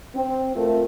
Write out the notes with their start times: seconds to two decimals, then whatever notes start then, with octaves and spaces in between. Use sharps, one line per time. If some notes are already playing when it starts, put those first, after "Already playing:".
0.15 C4
0.56 A3 F4 A#4